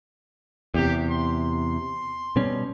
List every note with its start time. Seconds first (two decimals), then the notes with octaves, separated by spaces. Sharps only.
0.74 E2 C3 G4
1.09 C6
2.36 B2 G3 C#4